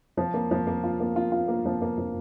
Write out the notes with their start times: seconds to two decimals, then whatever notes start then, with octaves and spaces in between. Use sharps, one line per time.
0.17 F3
0.34 A#3
0.51 F3
0.67 A#3
0.84 F4
1.00 A#3
1.16 F4
1.32 F4
1.48 A#3
1.65 F3
1.82 A#3
1.98 F3